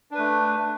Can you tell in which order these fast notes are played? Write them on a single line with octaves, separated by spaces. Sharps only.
D4 B4 A3